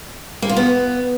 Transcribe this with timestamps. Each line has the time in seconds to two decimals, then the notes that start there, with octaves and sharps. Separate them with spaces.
0.42 A#3
0.49 F4
0.56 B3